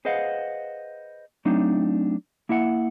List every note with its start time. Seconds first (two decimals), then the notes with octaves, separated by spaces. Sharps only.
0.05 G#4 B4 C5 D#5 F5 F#5
1.45 F#3 A3 C4 D4 D#4
2.49 A#3 E4 E5 F#5